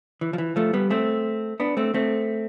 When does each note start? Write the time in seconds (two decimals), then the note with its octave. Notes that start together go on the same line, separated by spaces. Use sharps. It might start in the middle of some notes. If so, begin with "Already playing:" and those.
0.21 E3
0.33 F3
0.38 E3
0.56 F3 A3
0.73 G3 B3
0.90 A3 C4
1.60 B3 D4
1.77 A3 C4
1.94 A3 C4